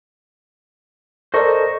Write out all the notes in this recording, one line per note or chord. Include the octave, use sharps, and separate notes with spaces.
A4 A#4 C5 D5 D#5 C#6